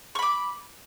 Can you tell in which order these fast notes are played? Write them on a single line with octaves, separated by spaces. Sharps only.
C#6 B5 D6